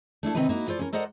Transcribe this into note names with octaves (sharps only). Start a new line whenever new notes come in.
A3 D4 E4 A4
C3 D#3 C4 C#4 D#4 B4
A#3 D#4 E4 F#4
F4 A4 C5 D5
C#4 A#4
A4 A#4 C5 D5 D#5 F#5